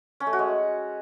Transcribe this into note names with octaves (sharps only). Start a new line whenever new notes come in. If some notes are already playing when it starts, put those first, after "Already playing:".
C#4
A3
F#4
G#3